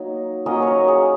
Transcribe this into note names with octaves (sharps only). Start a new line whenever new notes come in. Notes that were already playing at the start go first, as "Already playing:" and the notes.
Already playing: F#3 A#3 D#4
F#3 A#3 C#4 D#5
C#5
A#4
G#4